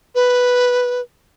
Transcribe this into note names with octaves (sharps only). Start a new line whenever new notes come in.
B4